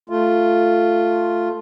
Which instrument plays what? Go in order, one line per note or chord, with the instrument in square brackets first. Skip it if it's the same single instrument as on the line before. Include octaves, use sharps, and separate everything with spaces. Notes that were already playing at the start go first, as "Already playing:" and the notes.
[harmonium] A3 F4